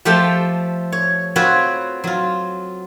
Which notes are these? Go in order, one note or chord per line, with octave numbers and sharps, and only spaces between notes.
F3 A3 G4 C5 F5 G5
C#5
C4 F4 F#4 B4 C#5
F#3 F4